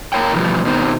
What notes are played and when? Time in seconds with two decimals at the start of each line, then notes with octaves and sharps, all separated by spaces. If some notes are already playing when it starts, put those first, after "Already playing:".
0.13 A#4 C#5 G5
0.33 B2 E3 F3 G3
0.65 B2 D#3 C4